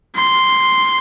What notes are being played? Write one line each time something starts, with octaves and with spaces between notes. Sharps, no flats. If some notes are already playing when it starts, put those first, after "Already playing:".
C6